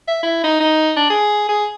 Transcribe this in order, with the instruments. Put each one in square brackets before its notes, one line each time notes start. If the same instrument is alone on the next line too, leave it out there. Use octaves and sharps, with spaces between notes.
[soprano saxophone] E5
E4
D#4
D#4
D4
G#4
G#4